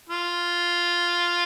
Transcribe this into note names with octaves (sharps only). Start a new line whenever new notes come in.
F4